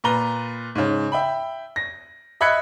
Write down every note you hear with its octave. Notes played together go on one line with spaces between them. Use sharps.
A#2 B4 A#5 G7
G#2 C#3
E5 G5 B5
A#6
D#5 E5 B5 F#6 G#6 C#7